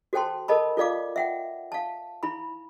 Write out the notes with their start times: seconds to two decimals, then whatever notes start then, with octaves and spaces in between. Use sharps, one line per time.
0.13 F#4 A4 C5 G5 A5 C6
0.48 A4 A#4 D#5 A5 B5
0.77 F4 A4 D5 F5 D6
1.16 E5 F#5 G5
1.72 F5 A5
2.23 E4 B5